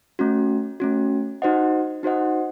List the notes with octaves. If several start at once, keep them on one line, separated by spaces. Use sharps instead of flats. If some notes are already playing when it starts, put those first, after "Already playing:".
A3 C#4 F#4
A3 C#4 F#4
D#4 F#4 C5 D#5 F#5
D#4 F#4 C5 D#5 F#5